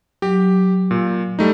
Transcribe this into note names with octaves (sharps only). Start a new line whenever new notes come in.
F#3 G4
A#2
G3 A3 D#4